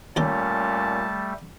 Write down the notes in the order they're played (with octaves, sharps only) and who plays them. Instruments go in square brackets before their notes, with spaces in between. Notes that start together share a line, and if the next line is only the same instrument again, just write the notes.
[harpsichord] D#2 G4 A#4 [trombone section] A#2 C#4 [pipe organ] G3 A3 [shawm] A5